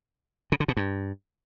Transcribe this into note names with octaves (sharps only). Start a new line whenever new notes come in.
C#3
D3
B2
G2